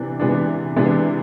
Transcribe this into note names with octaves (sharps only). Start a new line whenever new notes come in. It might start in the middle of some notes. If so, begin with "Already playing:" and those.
Already playing: C3 E3 D4
C3 E3 G#3 B3 D4
C3 E3 G#3 B3 D4